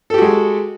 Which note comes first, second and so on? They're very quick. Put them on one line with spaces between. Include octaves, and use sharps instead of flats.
A4 G4 F#4 G#3